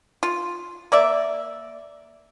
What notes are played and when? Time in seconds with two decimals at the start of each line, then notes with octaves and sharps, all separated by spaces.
0.23 F4
0.92 A#3 D5 E5